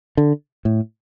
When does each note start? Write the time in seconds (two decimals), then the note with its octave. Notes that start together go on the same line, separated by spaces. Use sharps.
0.17 D3
0.65 A2